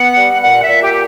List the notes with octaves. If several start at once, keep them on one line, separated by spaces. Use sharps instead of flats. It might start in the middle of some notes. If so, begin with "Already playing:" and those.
Already playing: B3 F#5
G3
A#2 F#5
E5
A#2
G4